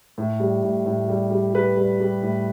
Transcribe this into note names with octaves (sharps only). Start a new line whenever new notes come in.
A2
G3
A2
A2
G3
G3
G3 B4
G3
G3
A2